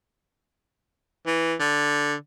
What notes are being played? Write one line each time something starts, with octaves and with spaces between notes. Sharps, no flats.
E3
D3